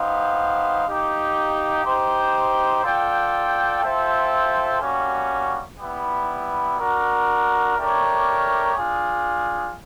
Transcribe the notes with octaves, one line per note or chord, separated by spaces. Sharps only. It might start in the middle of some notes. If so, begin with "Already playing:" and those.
Already playing: B3 D#4 G4 C5 F5
A#3 D#4 G4
D#4 G4 C5
F4 A4 D5 G5
F4 A4 C5 E5 G5
G3 A#3 C#4 F#4
G3 B3 E4
D4 F#4 A#4
A3 D4 G4 A#4 C#5
D4 F4 G#4